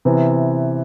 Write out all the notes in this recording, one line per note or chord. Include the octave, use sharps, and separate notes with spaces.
C3 E3 B3